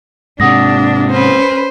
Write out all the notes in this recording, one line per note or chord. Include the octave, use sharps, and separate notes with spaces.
G#2 C3 D4 F#5 D#6 A#6
C#4 B4 C5